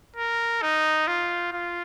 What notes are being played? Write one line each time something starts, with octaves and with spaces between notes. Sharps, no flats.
A#4
D#4
F4
F4